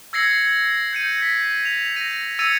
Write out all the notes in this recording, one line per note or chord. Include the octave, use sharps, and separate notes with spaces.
E6 G#6 A#6 C7 C#7 F#7
G6 C#7 D#7
B6
F7
A#6 D#7
E6 G#6 A6 C#7 D#7 F7